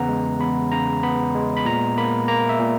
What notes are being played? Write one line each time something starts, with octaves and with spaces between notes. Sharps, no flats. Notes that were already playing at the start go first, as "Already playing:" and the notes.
Already playing: E2 C#3 B3 F#5 A#5
G#3
E2 B5
C#3 A#5
B3 B5
G#3
B5
A#2 A#5
A#3 B5
A#3 A#5
E5
A#2